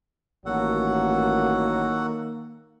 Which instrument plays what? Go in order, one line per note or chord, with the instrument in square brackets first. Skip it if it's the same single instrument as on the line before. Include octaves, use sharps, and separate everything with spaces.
[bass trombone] A1 [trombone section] D#3 A#3 [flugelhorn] F#3 [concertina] F#4 A4 F#5